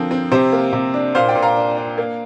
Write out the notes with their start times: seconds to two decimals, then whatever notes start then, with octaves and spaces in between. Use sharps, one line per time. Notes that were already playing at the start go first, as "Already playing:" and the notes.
Already playing: D3 F3 C4 A#4
0.11 C4
0.32 C3 G4 C5
0.52 A#3
0.73 C3
0.94 D4
1.15 A#2 C5 F5
1.28 D5 G5
1.35 A#2
1.42 F5 A#5
1.56 D4
1.77 D4
1.98 A#3